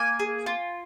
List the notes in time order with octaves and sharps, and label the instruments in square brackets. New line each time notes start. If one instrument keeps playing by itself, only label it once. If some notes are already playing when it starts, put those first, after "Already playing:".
Already playing: [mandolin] A#3 G#5
G#4
F4